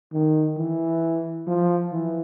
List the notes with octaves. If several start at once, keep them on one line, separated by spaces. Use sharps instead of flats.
D#3
E3
F3
E3